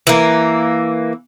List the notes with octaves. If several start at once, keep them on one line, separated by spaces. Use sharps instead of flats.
E3 A#3